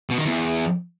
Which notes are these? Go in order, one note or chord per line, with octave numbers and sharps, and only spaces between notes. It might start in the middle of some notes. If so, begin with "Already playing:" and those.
B2
D#3
E2